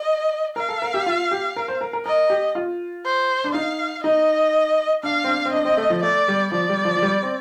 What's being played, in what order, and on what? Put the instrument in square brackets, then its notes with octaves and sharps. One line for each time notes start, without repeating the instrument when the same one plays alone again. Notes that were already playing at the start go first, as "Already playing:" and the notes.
Already playing: [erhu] D#5
[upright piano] A#4 [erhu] F5
[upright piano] A4
A#4
G4
F4
G4
A#4
C5
A#4
A#4
[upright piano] A#4 [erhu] D#5
[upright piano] G4
F4
[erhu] C5
[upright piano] D4
[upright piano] D#4 [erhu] F5
[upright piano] D#4 [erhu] D#5
[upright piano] D4 [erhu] F5
[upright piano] C4
D4
C4
[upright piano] D4 [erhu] D#5
[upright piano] C4
A3
F3
[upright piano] A3 [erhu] D5
[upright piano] G3
[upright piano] F3 [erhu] D5
[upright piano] G3
F3
F3
G3
C4